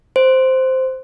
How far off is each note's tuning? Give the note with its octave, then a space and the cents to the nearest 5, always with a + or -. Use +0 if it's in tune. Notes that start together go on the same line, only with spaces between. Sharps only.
C5 -5